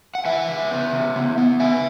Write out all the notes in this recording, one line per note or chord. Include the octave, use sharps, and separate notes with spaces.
F#5
E3 E5 G#5
C#3
B3
C#3
B3
B3
C#3 E5 G#5